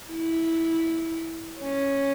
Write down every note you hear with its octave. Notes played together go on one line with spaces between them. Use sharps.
E4
C#4